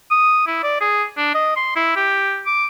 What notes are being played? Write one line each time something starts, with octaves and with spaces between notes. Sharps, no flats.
D#6
E4
D5
G#4
D4
D#5
C6
E4
G4
D6